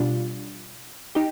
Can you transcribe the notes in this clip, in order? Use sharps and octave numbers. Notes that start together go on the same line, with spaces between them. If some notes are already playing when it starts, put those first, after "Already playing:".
Already playing: B2 G3 D4 F4
D#4 G4